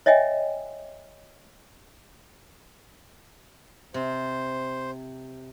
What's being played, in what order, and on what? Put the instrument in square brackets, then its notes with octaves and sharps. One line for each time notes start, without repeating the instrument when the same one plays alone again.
[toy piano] C#5 D#5 E5 G5 G#5
[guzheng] C3 [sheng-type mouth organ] C5